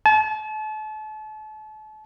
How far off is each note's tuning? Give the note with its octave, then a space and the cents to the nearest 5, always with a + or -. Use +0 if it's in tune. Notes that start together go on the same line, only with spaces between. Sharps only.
A5 -35